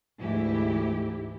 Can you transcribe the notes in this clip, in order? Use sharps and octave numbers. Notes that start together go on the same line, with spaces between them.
D2 G#2 E3 E4 G4